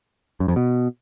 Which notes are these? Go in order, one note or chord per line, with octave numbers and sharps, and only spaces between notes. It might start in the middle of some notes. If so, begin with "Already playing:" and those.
F#2
F2
B2